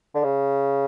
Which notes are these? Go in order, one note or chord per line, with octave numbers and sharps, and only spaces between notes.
D3
C#3